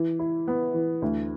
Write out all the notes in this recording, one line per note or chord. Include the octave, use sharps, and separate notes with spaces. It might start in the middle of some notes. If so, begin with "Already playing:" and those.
Already playing: E3
E4
B3
E3
D2